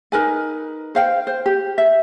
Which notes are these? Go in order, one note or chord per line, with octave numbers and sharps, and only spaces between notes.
D#4 A#4 B4 G#5
C5 F5 G5
C5
G4
E5